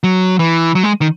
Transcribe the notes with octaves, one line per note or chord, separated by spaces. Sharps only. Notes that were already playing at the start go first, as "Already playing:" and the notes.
F#3
E3
F#3
G#3
D#3